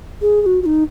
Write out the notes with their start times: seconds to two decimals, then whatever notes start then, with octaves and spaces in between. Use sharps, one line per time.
0.21 G#4
0.41 G#4
0.46 F#4
0.62 F#4
0.66 D#4